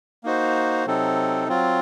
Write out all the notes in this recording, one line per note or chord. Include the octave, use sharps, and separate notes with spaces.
A#3 D#4 F#4 C5
C3 F#3 C4 D#4 A4
F#3 C4 F4